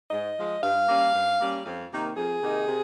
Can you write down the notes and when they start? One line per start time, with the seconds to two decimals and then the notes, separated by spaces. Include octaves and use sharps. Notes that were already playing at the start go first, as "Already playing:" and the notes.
0.10 G#2 D#5
0.36 F3 G#3
0.62 G2 F5
0.88 G3 A#3 C#4
1.13 G2
1.39 G3 A#3 C#4
1.64 F2
1.90 C3 D#3 A#3 D#4
2.16 F2 G#4
2.41 C3 D#3 A#3 D#4
2.67 C3